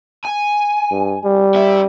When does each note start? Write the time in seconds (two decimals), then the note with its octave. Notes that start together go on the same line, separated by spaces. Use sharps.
0.25 G#5
0.91 G2
1.24 G3
1.55 C#4 E5